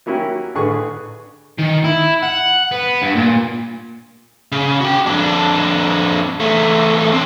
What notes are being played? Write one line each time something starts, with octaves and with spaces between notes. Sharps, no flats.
F#3 A#3 C#4 E4 F#4 G4
A1 D3 G#4 B4 C#6
D#3
E4
F#5
B3
G2
A#2
C#3
F#4 G5
F2 D4
E2 A3
C4 D4